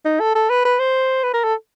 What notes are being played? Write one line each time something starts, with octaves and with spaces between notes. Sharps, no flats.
D#4
A4
A4
B4
B4
C5
B4
A#4
A4